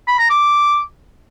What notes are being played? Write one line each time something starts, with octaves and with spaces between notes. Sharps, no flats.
B5
A#5
D6